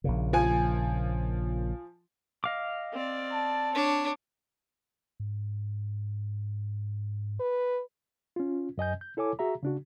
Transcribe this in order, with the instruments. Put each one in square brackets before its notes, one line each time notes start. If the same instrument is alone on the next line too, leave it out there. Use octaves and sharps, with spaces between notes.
[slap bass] A#1 A#2 C#3
[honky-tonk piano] F3 G#5
[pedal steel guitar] D#5 F5 D6
[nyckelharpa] C4 D5
[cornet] A5
[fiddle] D4 [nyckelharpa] C#5
[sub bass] G#2
[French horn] B4
[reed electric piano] C#4 F4
F#2 D#5 G#5 G6
G6
E4 A4 C#5 G#5 D6
F#4 G#4 E5 A#5
C#3 D4 F#4